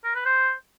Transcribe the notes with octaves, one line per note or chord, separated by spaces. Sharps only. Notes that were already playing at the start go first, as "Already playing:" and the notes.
A#4
B4
C5